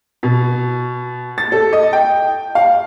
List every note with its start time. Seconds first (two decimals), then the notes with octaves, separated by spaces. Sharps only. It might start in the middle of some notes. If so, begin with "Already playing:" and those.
0.23 B2
1.38 A6
1.52 A4
1.73 D#5
1.93 G5
2.55 F5